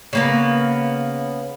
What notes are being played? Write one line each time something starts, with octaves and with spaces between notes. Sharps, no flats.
C#3 A#3 B3